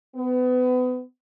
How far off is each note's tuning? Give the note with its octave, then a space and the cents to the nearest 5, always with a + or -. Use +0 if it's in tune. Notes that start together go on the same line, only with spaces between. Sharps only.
B3 +30